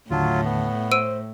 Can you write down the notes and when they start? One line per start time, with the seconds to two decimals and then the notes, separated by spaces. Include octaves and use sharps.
0.10 D#2 A2 D3 F#3 F4 A5
0.45 B3
0.91 C5 E6 D7 D#7